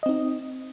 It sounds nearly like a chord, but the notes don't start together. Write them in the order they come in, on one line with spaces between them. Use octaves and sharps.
D#5 C4 D#4